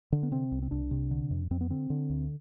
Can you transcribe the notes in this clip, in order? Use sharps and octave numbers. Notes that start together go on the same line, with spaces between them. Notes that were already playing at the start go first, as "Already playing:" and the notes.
D3
B3
C3 C4
C2
C4
C2 D4
C3
D3
F2
F2 C4
B3
D3 C4
D3
D2